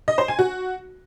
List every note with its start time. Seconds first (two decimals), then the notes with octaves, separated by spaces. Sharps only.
0.08 D#5
0.18 C5
0.28 G#5
0.39 F#4